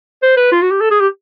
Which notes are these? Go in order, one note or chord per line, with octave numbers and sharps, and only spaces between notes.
C5
B4
F4
F#4
G4
A4
G#4
G4